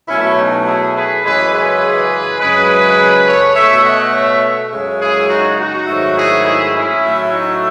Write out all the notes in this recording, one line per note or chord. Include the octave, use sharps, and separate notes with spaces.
B2 F#3 A3 C#4 E4
D#4 F#4
E4 G#4
G#4 B4
F#2 C#3 E3 G#3 G#4 B4
G#4 B4
F#2 C#3 G#3 G#4 B4
A4 C#5
B2 A3 C#5 E5
D#5 F#5
C#5 E5
F#2 C#3 G#3
E4 G#4
D#4 F#4
D#4 F#4
G#2 D#3 F#3 A3
E4 G#4
E4 G#4
C#4 E4
A2 F#3 A3
D#4 F#4